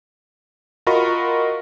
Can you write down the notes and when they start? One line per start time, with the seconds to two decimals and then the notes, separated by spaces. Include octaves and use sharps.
0.87 F4 F#4 A#4 D#5 B5 C#6